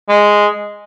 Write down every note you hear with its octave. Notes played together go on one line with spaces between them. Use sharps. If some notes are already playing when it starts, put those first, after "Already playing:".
G#3